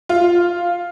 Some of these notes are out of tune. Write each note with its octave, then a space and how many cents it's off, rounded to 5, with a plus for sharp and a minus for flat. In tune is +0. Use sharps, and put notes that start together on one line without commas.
F4 +0